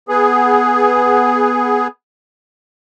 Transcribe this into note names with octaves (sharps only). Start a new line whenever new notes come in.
B3 G#4